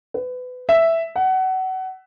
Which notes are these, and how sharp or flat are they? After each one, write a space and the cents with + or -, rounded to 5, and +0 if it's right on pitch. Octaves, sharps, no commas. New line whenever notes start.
B4 +25
E5 +0
F#5 +25